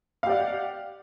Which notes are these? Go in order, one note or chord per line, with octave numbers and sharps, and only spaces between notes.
G4 D5 F5 F#5